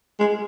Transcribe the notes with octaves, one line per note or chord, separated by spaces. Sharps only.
G#3